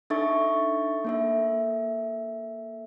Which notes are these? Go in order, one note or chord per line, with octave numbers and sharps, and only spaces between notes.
D4 D#4 A4 E5 C#6 A6
A#3 A4 E5